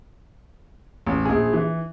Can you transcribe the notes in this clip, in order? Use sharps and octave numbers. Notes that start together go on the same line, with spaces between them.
A1
A#1 G#4
E3